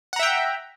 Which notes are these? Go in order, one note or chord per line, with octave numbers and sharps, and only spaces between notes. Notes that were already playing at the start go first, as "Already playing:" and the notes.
E5 F#5 G5 A#5